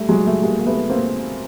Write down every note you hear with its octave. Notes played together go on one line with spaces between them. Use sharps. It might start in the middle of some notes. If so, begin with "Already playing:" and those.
Already playing: G3 A3
F#3 G#3
G3 A3
G#3 A#3
A#3
A3 B3
A#3 C4